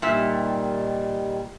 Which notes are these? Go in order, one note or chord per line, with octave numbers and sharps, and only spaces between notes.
A#2 D#3 G3 E5